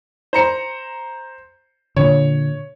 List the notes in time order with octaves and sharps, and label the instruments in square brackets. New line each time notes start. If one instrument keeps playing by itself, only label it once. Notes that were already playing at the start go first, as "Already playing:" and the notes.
[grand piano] C5 A#5 C#7
[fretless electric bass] A#2 D3 [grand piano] C#5